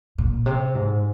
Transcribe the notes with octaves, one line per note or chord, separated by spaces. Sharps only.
A#2
C3
G#2